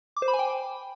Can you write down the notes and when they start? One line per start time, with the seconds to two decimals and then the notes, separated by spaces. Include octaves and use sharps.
0.17 D6
0.22 C5
0.28 B5
0.33 G#5
0.39 G5